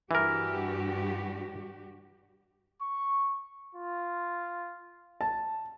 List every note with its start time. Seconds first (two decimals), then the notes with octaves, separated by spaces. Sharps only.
0.11 G2 E3 F#4 G4 A#4
2.82 C#6
3.75 F4
5.21 A5